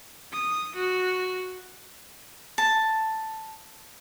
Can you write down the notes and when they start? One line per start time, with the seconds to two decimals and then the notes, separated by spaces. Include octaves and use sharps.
0.32 D#6
0.76 F#4
2.58 A5